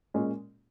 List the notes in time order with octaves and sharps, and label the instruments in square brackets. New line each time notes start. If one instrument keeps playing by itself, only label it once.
[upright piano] A#2 G#3 C#4